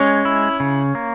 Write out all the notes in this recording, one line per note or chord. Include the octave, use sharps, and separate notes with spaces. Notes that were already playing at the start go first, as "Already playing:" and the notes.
Already playing: G#3 C#4 C#5
E4
C#3
A#3